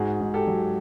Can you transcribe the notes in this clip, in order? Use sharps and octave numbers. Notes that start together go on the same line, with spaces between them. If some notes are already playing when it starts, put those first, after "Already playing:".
Already playing: G#2 F#4 G#4
G#2
G4 A4
F#3